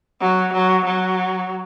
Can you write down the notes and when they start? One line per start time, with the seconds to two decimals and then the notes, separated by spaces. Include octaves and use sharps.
0.22 F#3
0.53 F#3
0.85 F#3